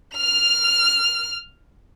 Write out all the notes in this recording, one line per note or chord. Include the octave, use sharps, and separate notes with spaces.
F6 F7